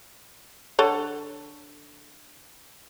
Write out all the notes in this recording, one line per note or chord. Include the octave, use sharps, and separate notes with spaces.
D3 A4 C#5